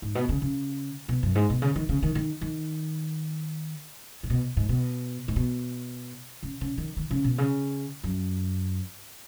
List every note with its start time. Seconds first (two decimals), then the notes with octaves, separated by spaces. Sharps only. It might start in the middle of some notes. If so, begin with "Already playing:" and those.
0.02 G#2
0.15 B2
0.29 C#3
0.42 C#3
1.09 B2
1.23 F#2
1.35 G#2
1.50 B2
1.62 C#3
1.76 D#3
1.89 C#3
2.03 D#3
2.15 D#3
2.41 D#3
4.23 G#2
4.30 B2
4.57 G#2
4.69 B2
5.28 G#2
5.36 B2
6.43 C#3
6.61 C#3
6.78 D#3
6.97 D#3
7.11 C#3
7.24 B2
7.38 C#3
8.03 F#2